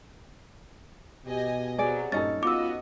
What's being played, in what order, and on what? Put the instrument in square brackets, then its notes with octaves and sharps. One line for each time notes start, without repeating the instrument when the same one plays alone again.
[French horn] B2 [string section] G4 D#5 G#5
[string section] C3 F#3 B3 [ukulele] G#4 D5
[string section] G2 A#2 [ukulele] C#4 D#4 A4 [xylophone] D#5 A6
[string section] B3 F#4 D#5 [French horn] F4 [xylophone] D6 E6